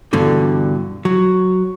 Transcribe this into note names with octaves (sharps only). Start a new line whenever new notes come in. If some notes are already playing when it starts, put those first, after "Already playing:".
G2 B2 D3 E3
F#3